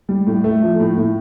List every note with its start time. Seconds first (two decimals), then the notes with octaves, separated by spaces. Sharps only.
0.09 G3
0.27 A2
0.44 A3
0.62 F3
0.80 A2
0.97 A2